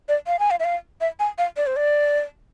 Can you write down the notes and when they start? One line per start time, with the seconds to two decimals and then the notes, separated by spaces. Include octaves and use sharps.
0.09 D5
0.27 F5
0.39 G#5
0.51 F5
0.60 E5
0.64 F5
1.01 E5
1.20 G#5
1.38 F5
1.57 D5
1.66 C5
1.76 D5